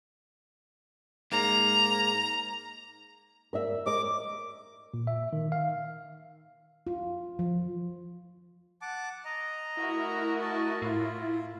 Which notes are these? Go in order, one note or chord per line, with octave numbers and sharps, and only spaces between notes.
G#2 A#3 A#5
A#4 D5 E5
A#4 C#5 D#5 D6
A#2
E5
D#3
F5
F4
F3
F#5 A5 D6
D#5 A#5
A3 E4 F#4 A#4
D#5 A5
A2 F4